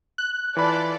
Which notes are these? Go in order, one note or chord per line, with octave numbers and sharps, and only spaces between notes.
F#6
E3 F4 A4 D5 B5